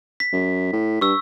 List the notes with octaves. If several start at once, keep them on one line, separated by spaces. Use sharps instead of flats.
B6
F#2
A2
G2 C#6 E6